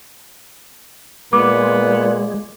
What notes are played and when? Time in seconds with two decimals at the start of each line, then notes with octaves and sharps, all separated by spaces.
1.33 A#2 G#3 B3 D6